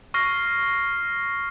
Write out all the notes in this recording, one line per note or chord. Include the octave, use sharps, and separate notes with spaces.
C#6 F6 A#6 C7